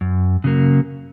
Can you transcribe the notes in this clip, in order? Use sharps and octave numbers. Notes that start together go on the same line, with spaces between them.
F#2
C#3 F#3 A#3